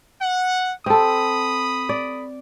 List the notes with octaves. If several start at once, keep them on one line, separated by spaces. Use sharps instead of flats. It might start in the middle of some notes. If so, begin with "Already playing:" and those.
F#5
C4 A4 B5 D#6
D5